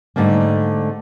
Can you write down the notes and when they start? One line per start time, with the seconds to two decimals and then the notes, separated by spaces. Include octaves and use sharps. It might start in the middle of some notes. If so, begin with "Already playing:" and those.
0.16 G#2 D3 G3 A3 A#3